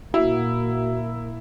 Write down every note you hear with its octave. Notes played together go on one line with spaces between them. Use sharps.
A#2 A#3 E4 F#4